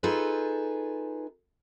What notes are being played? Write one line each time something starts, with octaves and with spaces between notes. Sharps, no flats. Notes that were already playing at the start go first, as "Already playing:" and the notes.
D#4 F4 G#4 A4 B4